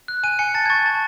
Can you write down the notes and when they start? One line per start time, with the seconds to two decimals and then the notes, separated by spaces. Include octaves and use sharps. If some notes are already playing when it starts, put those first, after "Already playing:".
0.08 F#6
0.23 G#5 D#7
0.39 G#5 C#7
0.54 A5 A6
0.66 G#6
0.70 C#6 A6
0.86 A5